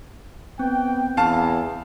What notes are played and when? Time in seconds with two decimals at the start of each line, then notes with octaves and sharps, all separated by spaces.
0.59 B3 C4 G5
1.17 E2 F5 A5